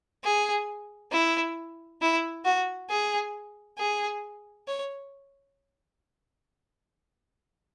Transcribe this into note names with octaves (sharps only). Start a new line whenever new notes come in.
G#4
E4
E4
F#4
G#4
G#4
C#5